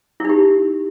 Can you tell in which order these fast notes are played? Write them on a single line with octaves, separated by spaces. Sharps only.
E4 D#4 G4